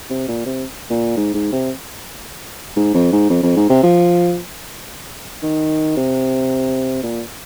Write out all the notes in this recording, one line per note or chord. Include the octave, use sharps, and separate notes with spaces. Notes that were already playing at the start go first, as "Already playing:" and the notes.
C3
A#2
C3
A#2
G#2
G#2
C3
G#2
F2
G#2
F2
F2
G#2
C3
F3
D#3
C3
A#2